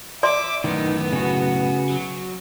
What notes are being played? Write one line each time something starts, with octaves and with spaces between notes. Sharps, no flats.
D5 E5 C6 D6
F#2 A2 D#3 B3 D#4
C#3 F#4
F#3